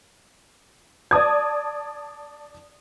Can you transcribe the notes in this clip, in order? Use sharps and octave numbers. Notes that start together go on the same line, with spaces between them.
D5 A5 D#6 G#6